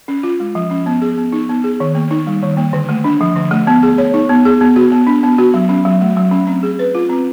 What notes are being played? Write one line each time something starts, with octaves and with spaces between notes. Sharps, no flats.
C#4
F4
G#3
F3
C#4
B3
G#4
B3
D#4
B3
G#4
D#3
A#3
D#4
G3
D#3
A#3
D3
A3
D4
F3
D3
A3
B3
G#4
C#5
D#4
B3
G#4
B3
F#4
B3
D4
B3
F#4
F#3
C#4
F#3
A3
F#3
C#4
C4
G#4
B4
F4
C4